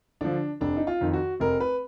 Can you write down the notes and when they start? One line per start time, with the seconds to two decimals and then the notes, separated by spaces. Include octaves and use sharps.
0.21 D3 F3 D4
0.61 F1 D4
0.77 D#4
0.87 F4
1.01 F2 D#3
1.13 F#4
1.40 F1 A#4
1.60 B4